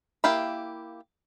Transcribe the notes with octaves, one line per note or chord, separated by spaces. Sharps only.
A#3 E4 G4 F5 B5